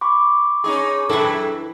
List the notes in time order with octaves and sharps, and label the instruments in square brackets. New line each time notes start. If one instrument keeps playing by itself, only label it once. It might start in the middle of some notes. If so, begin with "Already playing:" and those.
[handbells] B5 C#6 D6
[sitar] C#4 D#4 G#4
[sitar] F#2 E4 [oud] E3 A4